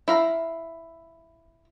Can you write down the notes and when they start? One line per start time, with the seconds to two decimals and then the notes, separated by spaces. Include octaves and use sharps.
0.08 E4 F5 A#5